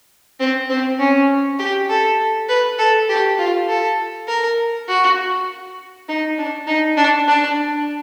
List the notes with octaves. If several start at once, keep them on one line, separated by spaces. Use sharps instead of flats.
C4
C4
C#4
G4
A4
B4
A4
G4
F4
A4
A#4
F#4
D#4
D4
D#4
D4
D4